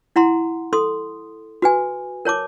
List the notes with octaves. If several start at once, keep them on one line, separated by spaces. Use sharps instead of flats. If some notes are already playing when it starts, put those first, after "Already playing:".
E4 F#5 A#5 C6
A4 C6 D#6
F#4 B4 G#5
A#4 C#5 A5 D6